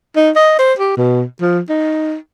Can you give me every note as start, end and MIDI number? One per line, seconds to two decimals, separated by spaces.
0.16 0.31 63
0.36 0.55 75
0.59 0.74 72
0.79 0.93 67
0.97 1.24 47
1.41 1.60 53
1.69 2.16 63